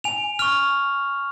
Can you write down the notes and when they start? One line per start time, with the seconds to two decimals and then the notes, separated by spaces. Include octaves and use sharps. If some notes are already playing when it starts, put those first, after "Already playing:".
0.04 G#5 F7
0.39 C#6 F6 F7